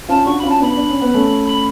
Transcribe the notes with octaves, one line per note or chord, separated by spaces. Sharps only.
C#4 F4 A5
D4 F#4 C#6
C#4 F4 B5
A5
B3 D4 B5
D4
C#4
B3
A3 C#4
B5